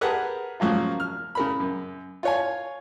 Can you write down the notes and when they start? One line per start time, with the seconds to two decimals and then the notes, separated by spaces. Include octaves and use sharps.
0.01 G4 G#4 A#4 B4 F#5 A5
0.60 C#3 F3 F#3 A#3 F4
1.00 F6
1.35 C#3 A#4 B5
1.60 F#2
2.23 F4 C#5 G#5